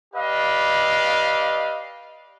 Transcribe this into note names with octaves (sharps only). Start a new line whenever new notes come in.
G4 B4 D5 D#5 F5